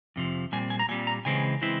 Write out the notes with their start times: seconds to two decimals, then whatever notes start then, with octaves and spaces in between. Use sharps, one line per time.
0.16 F2 C3 F3
0.52 A#2 G3 C4 G#5
0.70 G#5
0.79 A#5
0.89 A#2 G3 C4 G#5
1.07 A#5
1.25 C#3 E3 G#3 C4 E4 G#5
1.61 C#3 E3 G#3 C4 E4